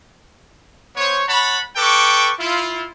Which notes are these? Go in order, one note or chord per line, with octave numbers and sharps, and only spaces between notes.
B3 C5 C#5
C#5 F#5 A5 B5
A4 B4 G5 C#6 D6
E4 F4